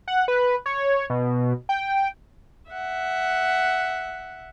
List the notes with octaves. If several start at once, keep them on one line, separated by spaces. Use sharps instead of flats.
F#5
B4
C#5
B2
G5
E5 F#5